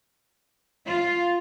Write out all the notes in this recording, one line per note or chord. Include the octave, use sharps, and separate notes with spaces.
F4